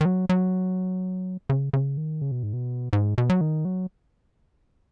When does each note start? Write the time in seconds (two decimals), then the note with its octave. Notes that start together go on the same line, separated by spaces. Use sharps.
0.01 D#3
0.05 F#3
0.29 F#3
1.50 C#3
1.73 C#3
1.97 D#3
2.21 C#3
2.32 B2
2.43 G#2
2.53 B2
2.93 G#2
3.18 B2
3.30 F#3
3.41 D#3
3.65 F#3